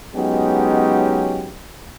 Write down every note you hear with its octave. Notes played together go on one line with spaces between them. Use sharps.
F#3 G#3 B3 C#4 D#4 G4